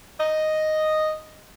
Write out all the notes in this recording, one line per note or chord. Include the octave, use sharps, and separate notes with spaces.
D#5